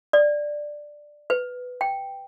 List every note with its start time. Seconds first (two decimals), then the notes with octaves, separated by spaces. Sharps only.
0.13 D5
1.30 B4
1.81 G5